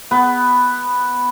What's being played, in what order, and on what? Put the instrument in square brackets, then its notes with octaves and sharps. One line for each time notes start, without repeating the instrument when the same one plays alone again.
[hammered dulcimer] B3